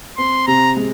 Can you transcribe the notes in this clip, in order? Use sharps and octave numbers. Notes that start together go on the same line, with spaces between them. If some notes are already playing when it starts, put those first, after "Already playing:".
C4 C6
C3 A#5
G#3